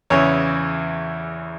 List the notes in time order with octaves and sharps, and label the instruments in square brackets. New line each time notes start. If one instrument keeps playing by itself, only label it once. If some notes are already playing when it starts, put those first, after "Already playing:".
[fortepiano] E2 C#3 E3 C#5